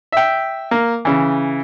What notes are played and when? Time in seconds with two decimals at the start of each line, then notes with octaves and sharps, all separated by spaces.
0.12 E5 G5
0.71 A#3
1.05 C#3 E3